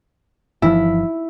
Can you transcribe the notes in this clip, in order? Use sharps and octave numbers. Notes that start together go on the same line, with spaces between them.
G1 E3 F3 E4